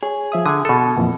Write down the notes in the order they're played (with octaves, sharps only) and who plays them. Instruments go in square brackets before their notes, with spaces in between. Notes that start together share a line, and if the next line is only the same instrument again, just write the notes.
[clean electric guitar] G#4 [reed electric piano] C#5
[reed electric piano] F3 E5 D#6
[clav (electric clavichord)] D3 [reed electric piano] D#6 G#6
[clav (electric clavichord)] B2 A4
[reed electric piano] F2 A#2 E3